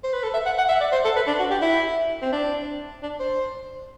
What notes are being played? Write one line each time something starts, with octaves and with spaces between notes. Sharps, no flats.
C5
B4
A4
E5
F#5
F#5
E5
D5
C5
A4
B4
D4
F#4
G4
E4
C4
D4
D4
C5